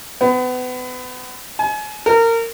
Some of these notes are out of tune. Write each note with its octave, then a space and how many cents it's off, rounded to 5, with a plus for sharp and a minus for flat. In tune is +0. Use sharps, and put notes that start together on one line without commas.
B3 +30
G#5 +35
A#4 -25